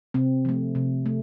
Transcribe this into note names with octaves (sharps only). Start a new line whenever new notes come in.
C3 C4
F3 A3
C3
A3